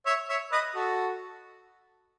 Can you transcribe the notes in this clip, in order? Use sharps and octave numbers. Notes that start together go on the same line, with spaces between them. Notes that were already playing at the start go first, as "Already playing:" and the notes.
C#5 E5
C#5 E5
B4 D#5
F#4 A4